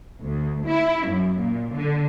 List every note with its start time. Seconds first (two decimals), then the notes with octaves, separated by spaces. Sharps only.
0.23 D2
0.65 E4
1.07 F#2
1.38 A#2
1.72 D3